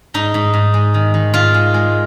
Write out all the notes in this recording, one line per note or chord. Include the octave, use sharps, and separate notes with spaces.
G#2 D#4
G#2
G#2
G#3
D#3
D#3
G#2 F4
G#3
G#3